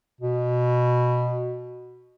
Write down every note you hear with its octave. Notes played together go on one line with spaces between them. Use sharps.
B2